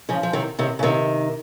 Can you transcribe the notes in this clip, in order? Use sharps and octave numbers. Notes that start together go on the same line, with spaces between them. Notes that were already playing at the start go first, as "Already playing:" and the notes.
C#3 F3
F3
C3 D#3
C3 D#3
C#3
C3 D#3